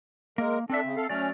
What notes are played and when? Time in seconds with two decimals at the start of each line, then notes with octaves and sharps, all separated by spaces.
0.38 G#3 A#3 A#4
0.70 C4 D4 A4 E5
0.84 C#3
0.97 A4 F5
1.09 F#3 A3 C#4 D5 F6